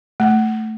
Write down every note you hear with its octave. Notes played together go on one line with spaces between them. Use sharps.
A3